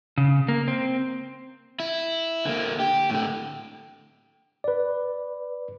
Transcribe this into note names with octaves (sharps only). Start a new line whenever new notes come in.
C#3
A#3
C4
E4
D3 A#3
G4
A2 D3
B4 D5